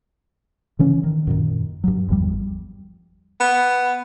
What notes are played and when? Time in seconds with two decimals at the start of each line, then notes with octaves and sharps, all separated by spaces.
0.79 C#3 E3 C#4
1.04 D#3
1.27 F#2 A#2 D#3
1.84 G2 F#3
2.09 G#1 E2 F3 G3
3.40 B3